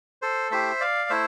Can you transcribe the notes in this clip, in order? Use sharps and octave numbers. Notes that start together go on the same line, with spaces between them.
A4 C5
A3 E4 G4 C5 E5
D5 F5
A3 E4 C5 E5